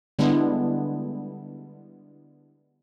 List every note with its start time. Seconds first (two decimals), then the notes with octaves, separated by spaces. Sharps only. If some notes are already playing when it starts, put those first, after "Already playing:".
0.19 D3 G3 G#3 B3 D4 E4